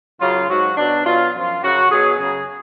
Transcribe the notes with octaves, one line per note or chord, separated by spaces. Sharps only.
F#2 C#3 F#3 F4
G#2 F#3 F#4
B2 F#3 D4
B2 F#3 F4
F#2 F3 F4
F#2 C#3 F#3 F#4
B2 F#3 G#4
F#2 C#3 F#3 G#4